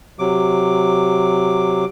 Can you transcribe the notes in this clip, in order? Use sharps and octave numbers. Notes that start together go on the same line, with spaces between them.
C3 F#3 D6